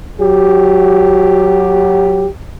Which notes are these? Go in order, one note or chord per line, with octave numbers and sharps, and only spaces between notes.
F#3 F#4 G4